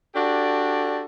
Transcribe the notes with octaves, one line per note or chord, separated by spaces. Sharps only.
D4 F#4 G4 A4 D5